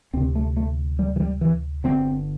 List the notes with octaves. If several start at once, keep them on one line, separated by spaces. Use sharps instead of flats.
D2 C3 C4
A3
A3
G3
E3
G3
E3
G1 G2 D3 C4